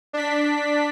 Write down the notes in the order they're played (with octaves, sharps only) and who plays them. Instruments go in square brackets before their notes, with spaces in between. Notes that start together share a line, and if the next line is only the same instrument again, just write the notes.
[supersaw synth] D4 B6